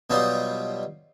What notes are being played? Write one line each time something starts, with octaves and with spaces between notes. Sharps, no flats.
B2 F#3 G3 D#4 F4